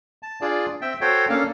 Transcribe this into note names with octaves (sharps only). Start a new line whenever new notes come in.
A5
D4 F4 G#4 D5
C4 E5 G5
F#4 A4 C5 C#5 G5
A#3 C#4 D4 A4 F5